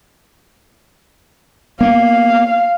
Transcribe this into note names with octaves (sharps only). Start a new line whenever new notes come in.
A#3 B3 F5